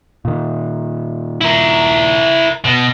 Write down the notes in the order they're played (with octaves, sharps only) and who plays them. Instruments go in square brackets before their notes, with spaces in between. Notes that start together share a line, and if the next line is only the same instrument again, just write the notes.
[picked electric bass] A#2 D#3
[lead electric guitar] E4 A#4
B2